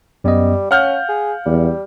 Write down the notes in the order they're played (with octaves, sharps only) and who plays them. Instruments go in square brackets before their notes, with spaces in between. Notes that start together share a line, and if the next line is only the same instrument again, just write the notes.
[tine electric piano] F#2 B3 D#5 [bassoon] G3
[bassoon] C#4 [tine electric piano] F5 [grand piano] F#5 F6 G6
[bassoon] G#4
[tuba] E2 [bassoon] G3